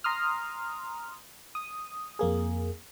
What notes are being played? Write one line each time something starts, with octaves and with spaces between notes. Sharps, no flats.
A#5 C6 D#6 F6
D#6
F2 A#3 G#4